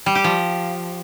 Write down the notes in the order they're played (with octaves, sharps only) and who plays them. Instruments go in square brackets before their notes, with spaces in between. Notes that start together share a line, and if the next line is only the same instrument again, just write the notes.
[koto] G3
G4
F3